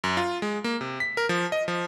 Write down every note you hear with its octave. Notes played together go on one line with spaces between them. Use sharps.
F#2
F4
G#3
A#3
C3
B6
A#4
F3
D#5
F3